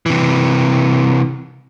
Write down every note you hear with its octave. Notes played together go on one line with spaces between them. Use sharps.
C3 E3